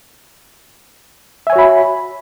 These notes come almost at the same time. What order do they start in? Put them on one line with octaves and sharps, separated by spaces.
E5 G#5 C#5 F#4 B5